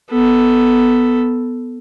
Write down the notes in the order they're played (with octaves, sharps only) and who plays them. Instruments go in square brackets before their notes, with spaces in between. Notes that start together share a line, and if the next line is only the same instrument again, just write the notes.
[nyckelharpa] B3 A4